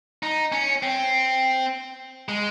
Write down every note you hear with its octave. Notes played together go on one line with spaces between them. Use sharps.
D#4
C#4
C4
G#3